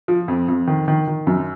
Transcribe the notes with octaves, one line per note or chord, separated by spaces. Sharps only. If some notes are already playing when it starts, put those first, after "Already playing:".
F3
F2
F2
D#3
D#3
D#3
F#2